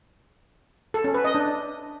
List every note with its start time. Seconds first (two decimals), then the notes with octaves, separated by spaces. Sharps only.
0.94 A4
1.04 C#4
1.14 B4
1.25 D#5
1.35 D4